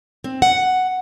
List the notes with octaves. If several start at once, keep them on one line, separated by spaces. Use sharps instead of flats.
C4
F#5